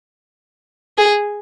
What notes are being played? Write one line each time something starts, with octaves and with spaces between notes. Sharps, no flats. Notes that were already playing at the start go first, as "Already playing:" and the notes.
G#4